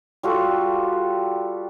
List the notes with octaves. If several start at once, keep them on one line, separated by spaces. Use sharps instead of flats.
G3 F4 F#4 A4